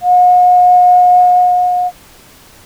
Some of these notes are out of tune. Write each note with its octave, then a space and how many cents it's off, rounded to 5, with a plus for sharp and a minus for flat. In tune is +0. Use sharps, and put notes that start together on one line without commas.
F#5 -45